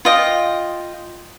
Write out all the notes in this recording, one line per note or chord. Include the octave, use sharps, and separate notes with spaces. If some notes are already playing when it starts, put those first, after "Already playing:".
F4 D#5 G5